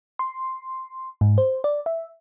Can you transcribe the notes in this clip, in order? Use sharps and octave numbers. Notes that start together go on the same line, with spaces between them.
C6
G#2
C5
D5
E5